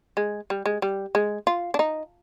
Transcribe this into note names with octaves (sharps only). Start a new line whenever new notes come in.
G#3
G3
G#3
G3
G#3
F4
D4
D#4